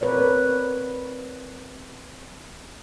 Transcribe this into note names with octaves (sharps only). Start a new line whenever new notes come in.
C4 A#4 B4 C#5 D5